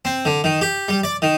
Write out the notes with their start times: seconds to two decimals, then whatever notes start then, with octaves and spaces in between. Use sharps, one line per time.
0.05 C4
0.25 D3
0.44 D#3
0.61 G4
0.88 G3
1.04 D5
1.22 D#3